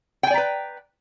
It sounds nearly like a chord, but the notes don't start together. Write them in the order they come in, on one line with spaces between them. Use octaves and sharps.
G5 G#5 D5 A#5 B4